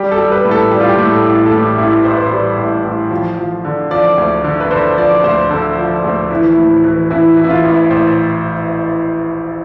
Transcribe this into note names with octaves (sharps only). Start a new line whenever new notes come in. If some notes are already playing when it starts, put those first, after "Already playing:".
Already playing: G3 G4
A4
G3
B4
A2
A4
G3 G4
F4
G4
A2
A4
A1
A4
A2 G4
A1 E4
A1 C5
B4
C5
G3
A1
A1
F3
F3
D3
F3 D5
D2
D3
B4
D3 C5
F3 D5
D2 C5
D3 A4
F3
D2
E3 E4
A2
E3
E3 E4
E3
E4
F4
A1
A1 C5